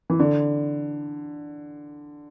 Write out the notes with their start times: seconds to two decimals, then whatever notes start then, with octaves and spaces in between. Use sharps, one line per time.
0.10 E3
0.19 D3